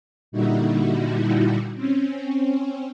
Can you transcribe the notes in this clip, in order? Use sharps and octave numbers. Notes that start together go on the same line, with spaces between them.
A#2 D3 G3 D#4 E4 F#4
C4 C#4